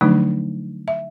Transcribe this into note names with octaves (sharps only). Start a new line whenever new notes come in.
D3 F3 F#3 A3 D4 D#4
E5